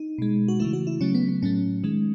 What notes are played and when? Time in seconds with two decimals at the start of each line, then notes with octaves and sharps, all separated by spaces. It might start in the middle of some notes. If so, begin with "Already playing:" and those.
Already playing: D#4
0.18 B2 G#3
0.48 F#4
0.60 C#3 E3 A3 E4
0.73 F#4
0.87 E4
1.00 C#3 F#3 A3 C#4
1.15 B3
1.29 B3
1.42 A2 F#3 A3 C#4
1.84 D#3 G#3